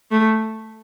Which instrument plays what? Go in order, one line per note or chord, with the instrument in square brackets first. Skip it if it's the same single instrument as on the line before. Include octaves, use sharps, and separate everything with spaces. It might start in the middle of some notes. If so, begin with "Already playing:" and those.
[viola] A3